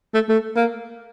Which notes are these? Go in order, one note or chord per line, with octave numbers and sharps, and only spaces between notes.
A3
A3
A#3